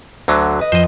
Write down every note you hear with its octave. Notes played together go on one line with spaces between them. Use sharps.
D2 D3 F#3
B4 D#5
F2 C5 D#5